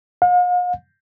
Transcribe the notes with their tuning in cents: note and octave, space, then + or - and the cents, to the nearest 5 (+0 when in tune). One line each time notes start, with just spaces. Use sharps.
F5 +45